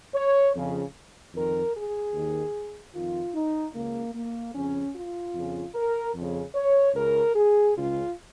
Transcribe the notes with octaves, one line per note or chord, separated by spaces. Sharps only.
C#5
F2 C#3
F2 D#3 A#4
G#4
D#2 D#3
F2 D#3 F4
D#4
C#2 C#3 A#3
A#3
F2 C#3 C#4
F4
F2 C#3
A#4
F2 C#3
C#5
C#2 C#3 A#4
G#4
C#2 C#3 F4